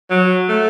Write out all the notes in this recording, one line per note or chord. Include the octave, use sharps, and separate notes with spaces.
F#3
A3